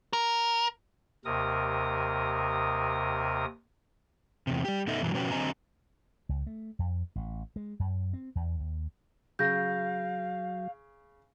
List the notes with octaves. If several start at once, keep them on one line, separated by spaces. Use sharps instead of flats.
A#4
D#2 C3 A#4 D#6
E2 C3
G3 G4
B2 D#4 A4 D#5 E5
F#2 B2 E3 F#3
B2 F3 C#4 F#4 B4 G5
D3 F#3 C4 D#5 G#5 A#5
C#2
A3
F2
A1
G#3
F#2
C4
E2
D#2
C#3 F#3 F5 G6 A#6